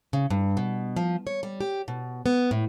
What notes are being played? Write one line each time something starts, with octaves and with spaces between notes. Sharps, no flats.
C#3
G2
B2
F3
C#5
G3
G4
B2
B3
A2